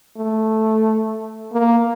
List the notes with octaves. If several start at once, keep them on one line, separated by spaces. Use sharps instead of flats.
A3
A#3